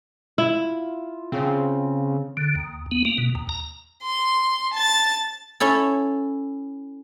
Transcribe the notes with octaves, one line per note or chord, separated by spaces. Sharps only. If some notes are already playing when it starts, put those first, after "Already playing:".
E4 F4
C#3 C4
D3
D#2
B3
A#3
B2
D#2
A#5
C6
A5 A6
C#4 E4 A4